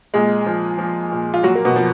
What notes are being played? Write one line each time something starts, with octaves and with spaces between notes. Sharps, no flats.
A#2 G#3 G#4
F3
F3
A#2
F4
A#2 F#3 F#4
A#3
B2 B3
F3